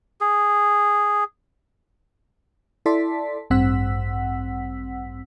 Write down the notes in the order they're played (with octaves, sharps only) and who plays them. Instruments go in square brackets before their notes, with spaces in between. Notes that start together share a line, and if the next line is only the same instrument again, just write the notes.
[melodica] G#4
[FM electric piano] E4 A4 D5 A5 C6 B6
A1 G2 C4 F#5 E6 B6